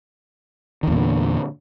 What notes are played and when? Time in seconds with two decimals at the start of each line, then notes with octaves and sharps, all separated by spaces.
0.83 D#3
0.87 E2
0.92 A#2
0.96 D3